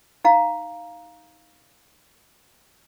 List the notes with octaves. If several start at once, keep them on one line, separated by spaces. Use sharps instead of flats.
D#4 F5 A#5